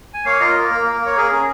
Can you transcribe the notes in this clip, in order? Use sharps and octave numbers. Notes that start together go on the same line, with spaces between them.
G#5
A#3 C#5 F5
F4 A#4 D#5
A#3 A#4
A#3
A#3
A#3
C#5
G#4 A#4
C#4 G#4